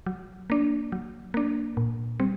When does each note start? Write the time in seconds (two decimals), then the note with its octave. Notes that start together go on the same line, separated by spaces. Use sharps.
0.06 F#3
0.50 A#3 D4
0.92 F#3
1.34 A#3 D4
1.77 A#2
2.20 G3 C4